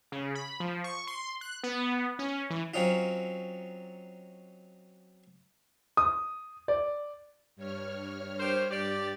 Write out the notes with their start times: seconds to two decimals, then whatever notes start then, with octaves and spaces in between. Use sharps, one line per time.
0.12 C#3
0.35 B5
0.60 F3
0.84 C#6
1.07 C6
1.41 F#6
1.63 B3
2.19 C#4
2.50 E3
2.74 F#3 C4 C#4 D#4 F4
5.97 D#6
6.68 D5
7.56 G2 C#5 F6
8.39 G4 A#4 C5
8.71 G2 G4 D5 A6